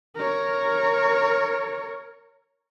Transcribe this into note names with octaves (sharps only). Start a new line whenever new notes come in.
A#4 C#5